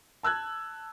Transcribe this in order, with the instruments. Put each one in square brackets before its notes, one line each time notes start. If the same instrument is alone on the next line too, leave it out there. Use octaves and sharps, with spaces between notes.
[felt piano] A5 E6 F#6 G#6